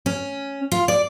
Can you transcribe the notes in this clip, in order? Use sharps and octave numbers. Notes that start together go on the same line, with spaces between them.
C#4
F4
D5